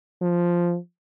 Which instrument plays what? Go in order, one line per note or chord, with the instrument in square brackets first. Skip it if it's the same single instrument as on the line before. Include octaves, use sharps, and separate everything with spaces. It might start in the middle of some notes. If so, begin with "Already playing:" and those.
[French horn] F3